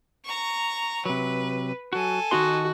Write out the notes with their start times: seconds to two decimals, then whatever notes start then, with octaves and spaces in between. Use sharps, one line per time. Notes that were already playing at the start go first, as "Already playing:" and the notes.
0.25 A#5 C#6
1.05 C3 F#3 B4
1.93 F#3 F#4 A4 G#5
2.31 D#3 D#4 F#4 C6